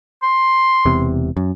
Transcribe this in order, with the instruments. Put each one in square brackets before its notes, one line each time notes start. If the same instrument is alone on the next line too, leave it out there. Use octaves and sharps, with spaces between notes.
[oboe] C6
[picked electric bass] E1 E2 C3
F#2